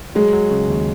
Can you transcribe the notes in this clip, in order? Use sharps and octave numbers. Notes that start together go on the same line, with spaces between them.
F#3 G#3
F#3
C#3
D#2